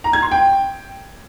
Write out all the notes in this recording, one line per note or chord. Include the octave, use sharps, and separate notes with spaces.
A#5
G#6
C6
G5